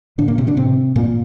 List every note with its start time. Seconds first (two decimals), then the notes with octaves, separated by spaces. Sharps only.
0.18 A2 D3 D4
0.28 A#2 A#3
0.38 C3 C4
0.47 D3 D4
0.57 A2 C3 C4
0.95 G2 A#2 A#3